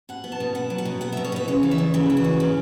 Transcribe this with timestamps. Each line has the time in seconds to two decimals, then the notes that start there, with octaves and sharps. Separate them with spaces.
0.09 B2 F#5
0.24 B3
0.32 A5
0.40 B2
0.55 B2 F#5
0.70 F#3
0.78 F#5
0.85 B2
1.01 B3 F#5
1.13 B2 E5
1.24 C#5
1.32 B2 B4
1.48 C#3 C#5
1.63 E3
1.71 E5
1.78 E2
1.94 C#3 B4
2.10 E3
2.17 F#4
2.24 E2
2.40 C#3 C#4